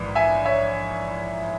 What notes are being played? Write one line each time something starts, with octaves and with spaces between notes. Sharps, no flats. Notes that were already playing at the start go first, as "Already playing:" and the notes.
Already playing: A#1 G#2 E3
E5 G#5
C#5 E5